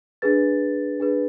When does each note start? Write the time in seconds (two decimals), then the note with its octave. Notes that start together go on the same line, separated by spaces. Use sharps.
0.22 D4 G#4 B4 A6
1.00 D4 G#4 B4